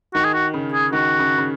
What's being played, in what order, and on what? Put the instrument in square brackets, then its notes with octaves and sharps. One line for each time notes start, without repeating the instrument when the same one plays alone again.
[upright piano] D#3 [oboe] F#4
[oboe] G#4
F#4
[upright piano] C#3
[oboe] G#4
[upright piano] D#3 [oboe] F#4
[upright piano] C#3
C#3